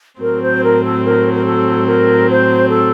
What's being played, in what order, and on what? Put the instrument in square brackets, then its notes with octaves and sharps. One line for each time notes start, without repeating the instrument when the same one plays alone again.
[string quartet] A2 F#3 C4 [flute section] A#4
[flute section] C5
A#4
A4
A#4
A#4
A4
A#4
C5
A4